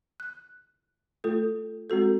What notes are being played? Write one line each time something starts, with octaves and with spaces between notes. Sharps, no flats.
F#6
A3 F4 A4
G#3 C4 F#4 A4